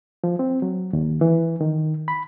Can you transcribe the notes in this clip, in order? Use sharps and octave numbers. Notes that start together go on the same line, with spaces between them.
F3
C4
F#3
D#2
E3
D#3
B5